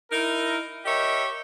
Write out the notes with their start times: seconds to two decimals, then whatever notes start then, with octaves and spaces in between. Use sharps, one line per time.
0.11 D#4 E4 A#4
0.85 G4 A#4 C#5 D#5 E5